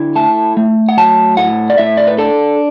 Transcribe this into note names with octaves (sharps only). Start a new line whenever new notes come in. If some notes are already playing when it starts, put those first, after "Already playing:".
Already playing: D3 E4
A3 A5
A3
F#5
F#3 A5
A2 F#5
D5
A2 E5
D5
B4
D4 A4